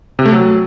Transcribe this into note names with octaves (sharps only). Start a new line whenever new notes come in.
C3
A3
F#3